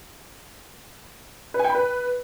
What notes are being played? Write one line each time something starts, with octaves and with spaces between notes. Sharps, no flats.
B4
G#5
G5
B5
B4